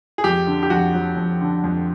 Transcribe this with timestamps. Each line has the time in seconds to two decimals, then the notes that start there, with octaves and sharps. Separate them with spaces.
0.18 G#4
0.24 F2 G4
0.47 D3
0.63 G4
0.70 F2 F#4
0.94 F#3
1.17 F2
1.41 D3
1.64 F2